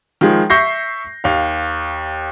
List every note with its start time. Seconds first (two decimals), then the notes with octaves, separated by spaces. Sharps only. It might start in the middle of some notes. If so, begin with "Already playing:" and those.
0.21 D#3 F3 G#3
0.50 E5 C#6 G6 A#6 C7
1.24 D#2 F5